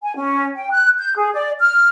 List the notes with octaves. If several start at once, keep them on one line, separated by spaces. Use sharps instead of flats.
G#5
C#4
G5
F#6
G6
G#4
D5
F6